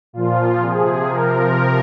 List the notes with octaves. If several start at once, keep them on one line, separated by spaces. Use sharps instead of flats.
A#2 F3 F4
C3 F3 G#4
C3 F3 A#4